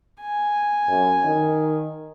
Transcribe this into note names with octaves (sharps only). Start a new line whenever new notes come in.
G#5
F#2
D#3